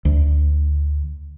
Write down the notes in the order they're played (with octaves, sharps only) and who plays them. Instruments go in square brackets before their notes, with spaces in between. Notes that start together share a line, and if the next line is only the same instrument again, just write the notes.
[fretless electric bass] D2